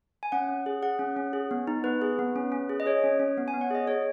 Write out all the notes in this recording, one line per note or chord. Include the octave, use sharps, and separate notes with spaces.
G#5
C#4 F#5
C#4
G#4
G#4 F#5
C#4
C#4
G#4
B3
D#4
B3 B4
G#4
B3
C#4
C#4
G#4
D#5
G#4 C#5
C#4
C#4
B3
G#5
B3
F#5
G#4 D#5
G#4 C#5